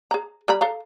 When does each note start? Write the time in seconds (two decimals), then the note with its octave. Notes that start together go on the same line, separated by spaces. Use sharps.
0.11 G#4 A#5
0.48 G3 A#5 B5
0.61 A4 F5 A#5